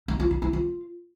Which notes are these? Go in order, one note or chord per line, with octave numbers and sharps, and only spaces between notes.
D#4
F4
D#4
E4
F4